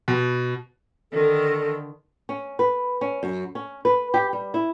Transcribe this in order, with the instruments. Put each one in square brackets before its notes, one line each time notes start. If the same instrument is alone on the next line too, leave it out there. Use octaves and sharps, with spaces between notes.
[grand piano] B2
[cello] D3 D#3 [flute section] A4
[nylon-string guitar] C#4
B4
C#4
F#2
C#4
B4
G4
G3
E4